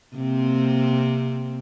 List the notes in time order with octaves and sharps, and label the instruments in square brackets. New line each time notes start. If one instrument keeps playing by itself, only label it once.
[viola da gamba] C3 A#3 C4